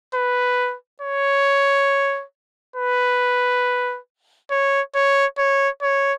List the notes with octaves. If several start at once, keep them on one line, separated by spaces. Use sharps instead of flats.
B4
C#5
B4
C#5
C#5
C#5
C#5